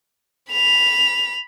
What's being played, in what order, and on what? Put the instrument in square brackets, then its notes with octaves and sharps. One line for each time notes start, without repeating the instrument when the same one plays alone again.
[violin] B5 F7